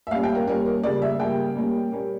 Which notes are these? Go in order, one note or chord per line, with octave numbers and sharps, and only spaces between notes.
E5
A#2 G3 C#4 F5
G5
A#4
A#2 G3 C#4 A#4
A#4
C#3 G3 A#3 D5
E5
C#3 G3 A#3 G5
A#2 G3 A#3 C#4
A#2 G3 A#3 C#4